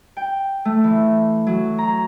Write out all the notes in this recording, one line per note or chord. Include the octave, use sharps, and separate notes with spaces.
G5
A3
E3
F#3
A#5